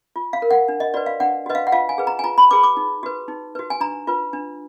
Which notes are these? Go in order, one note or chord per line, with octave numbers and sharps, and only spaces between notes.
F4
F5
A#4
F#5
D4
D#5
F#4 B4 D5
F5
D4 F#5
F#4 B4 D#5
F5
F#5
F4 F5
G#5
G#4 B4
A#5
G#5
F4 A#5
B5
G#4 B4 D6
D6
D#4
F#4 B4
D#4
F#4 B4
G#5
D4 A#5
F4 B4
D4